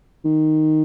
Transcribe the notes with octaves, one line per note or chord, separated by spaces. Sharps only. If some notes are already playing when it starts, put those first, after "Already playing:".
D#3